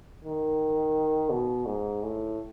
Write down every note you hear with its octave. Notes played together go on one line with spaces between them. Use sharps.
D#3
B2
G#2
A2